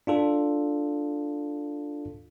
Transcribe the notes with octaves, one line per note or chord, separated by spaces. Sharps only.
D4 F4 A4